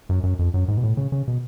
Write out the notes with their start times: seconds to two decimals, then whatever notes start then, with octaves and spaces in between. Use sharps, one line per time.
0.09 F#2
0.23 F#2
0.39 F2
0.54 F#2
0.68 G#2
0.77 B2
0.83 A2
0.97 C#3
1.12 C#3
1.28 B2